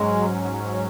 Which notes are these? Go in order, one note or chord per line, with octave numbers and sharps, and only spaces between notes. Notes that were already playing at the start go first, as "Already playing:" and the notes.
Already playing: G#2 F#3 G#3 C#4